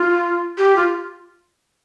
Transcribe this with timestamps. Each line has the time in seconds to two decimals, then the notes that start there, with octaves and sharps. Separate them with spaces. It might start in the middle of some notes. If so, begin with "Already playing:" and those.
Already playing: F4
0.58 G4
0.76 F4